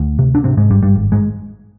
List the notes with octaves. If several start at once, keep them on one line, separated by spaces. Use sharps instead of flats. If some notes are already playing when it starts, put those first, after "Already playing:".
Already playing: D2
C3
D4
G#2 C3 C4
G#2 G#3
G#1 G2 G3
G2 G3
G#1
G#2 G#3